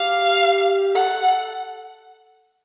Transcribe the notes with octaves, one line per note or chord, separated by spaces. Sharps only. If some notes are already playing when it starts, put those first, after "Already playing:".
Already playing: G4 F5
A4 F#5